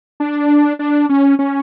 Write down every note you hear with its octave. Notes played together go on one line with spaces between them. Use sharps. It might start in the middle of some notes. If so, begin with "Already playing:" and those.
D4
D4
C#4
C#4